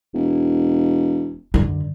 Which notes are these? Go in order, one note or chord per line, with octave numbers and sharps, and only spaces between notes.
E1
F#2 D3